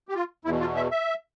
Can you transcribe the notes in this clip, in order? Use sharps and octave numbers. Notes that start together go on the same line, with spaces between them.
G4
F4
E2 B2 E4
F4
E5
E5